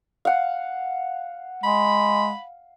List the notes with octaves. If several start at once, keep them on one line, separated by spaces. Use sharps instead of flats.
F5 F#5
G#3 B5